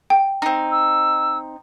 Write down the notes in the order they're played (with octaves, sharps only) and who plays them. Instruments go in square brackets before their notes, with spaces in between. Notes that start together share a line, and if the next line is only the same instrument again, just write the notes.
[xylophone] G5
[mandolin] C4 D#4
[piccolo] E6